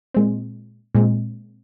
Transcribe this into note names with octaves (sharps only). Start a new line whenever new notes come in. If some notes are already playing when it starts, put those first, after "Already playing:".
A#2 G#3 C4
A#2 G#3 C4